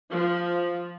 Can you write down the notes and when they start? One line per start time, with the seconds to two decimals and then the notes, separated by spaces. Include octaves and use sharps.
0.12 F3